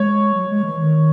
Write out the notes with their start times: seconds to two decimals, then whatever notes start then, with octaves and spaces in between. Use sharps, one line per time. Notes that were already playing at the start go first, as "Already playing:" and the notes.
Already playing: G#3 C#5
0.34 F#3
0.49 G#3
0.64 E3
0.79 D#3